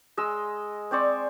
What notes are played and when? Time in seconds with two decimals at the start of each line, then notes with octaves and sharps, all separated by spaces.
0.17 G#3 D#5 E6
0.91 C4 C5 D5 C#6